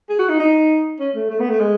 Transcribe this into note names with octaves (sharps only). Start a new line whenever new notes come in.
G#4
F#4
D#4
D#4
C#4
A3
A3
B3
A3
G#3